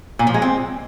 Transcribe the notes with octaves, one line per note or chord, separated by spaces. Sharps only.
A#2
F3
G#3
C4